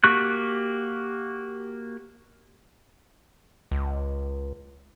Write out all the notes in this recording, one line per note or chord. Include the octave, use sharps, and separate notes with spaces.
A#3 F#4 G4 C#6 F#6
C#2